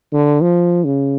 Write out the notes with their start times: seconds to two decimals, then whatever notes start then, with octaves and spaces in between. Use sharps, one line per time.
0.13 D3
0.41 F3
0.85 C#3